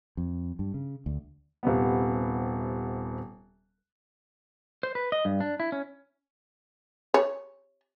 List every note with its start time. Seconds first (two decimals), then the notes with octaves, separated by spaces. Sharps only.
0.17 F2
0.59 G2
0.74 C#3
1.06 D2
1.63 D#1 C3 B3
4.83 C5
4.95 B4
5.12 D#5
5.25 G2
5.40 D4
5.60 E4
5.72 C#4
7.14 C#5